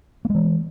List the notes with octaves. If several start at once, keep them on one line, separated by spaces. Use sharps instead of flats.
E3 G#3 A#3